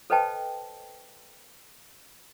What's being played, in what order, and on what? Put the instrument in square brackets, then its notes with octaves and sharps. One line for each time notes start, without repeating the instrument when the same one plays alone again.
[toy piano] A4 B4 C5 D#5 G5 A5